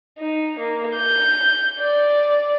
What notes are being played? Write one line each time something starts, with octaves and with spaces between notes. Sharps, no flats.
D#4
A#3
G6
D5